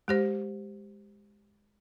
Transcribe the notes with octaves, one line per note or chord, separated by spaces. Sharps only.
G#3 G4 C5